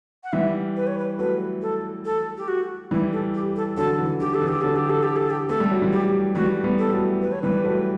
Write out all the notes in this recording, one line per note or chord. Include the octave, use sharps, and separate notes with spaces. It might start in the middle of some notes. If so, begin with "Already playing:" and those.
F#5
E3 G3 E5
B4
C#5
B4
F#3 A3 B4
A4
A4
G4
F#4
E3 G3 E4
A4
G4
A4
D3 F#3 A4
E3
D3 G4
A4
E3
G4
D3 F#3 A4
G4
A4
G4
A4
G4
A3 A4
G3
F#3
E3 G3
G4
E3 G3 F#4
G3 B3
A4
F#3 A3
B4
C#5
E3 G3 B4
F#3 A3